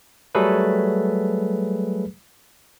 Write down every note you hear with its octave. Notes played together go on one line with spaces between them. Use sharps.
F#3 G3 A3 G#4 A4 B4